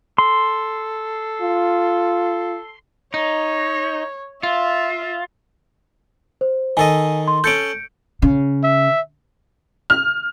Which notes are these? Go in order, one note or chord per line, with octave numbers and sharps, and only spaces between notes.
A4 C6
F4
D#4 C#5
F4 E5
C5
D#3 A4 D#5 G#5
C6
C#4 A4 G6 C#7 D7
C#3
E5
F6